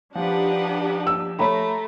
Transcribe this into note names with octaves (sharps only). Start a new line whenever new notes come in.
F3 D4 D#4 G4 B4 F#5
E6
A3 C#5 A#5 B5